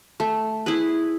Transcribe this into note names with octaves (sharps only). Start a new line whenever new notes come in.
A3
E4 G#4 B4